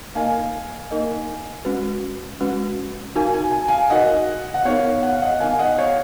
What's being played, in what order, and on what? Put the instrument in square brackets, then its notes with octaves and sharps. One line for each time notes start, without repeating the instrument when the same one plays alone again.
[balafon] A#3 D#4 A#4 D#5 [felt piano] F5 G#5
[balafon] A#3 D#4 A#4 D#5
G#3 C#4 F#4 B4
G#3 C#4 F#4 B4
[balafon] D#4 F#4 A#4 F5 [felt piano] G#5
[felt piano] G#5
G#5
F5 G#5
[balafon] D#4 F#4 A#4 F5 [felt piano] D#5 F#5
[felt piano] F#5
[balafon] B3 D#4 A#4 [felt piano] C#5 F5
[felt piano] F#5
F5
D#5 F#5
[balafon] B3 D#4 A#4 [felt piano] F5 G#5
[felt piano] D#5 F#5
C#5 F5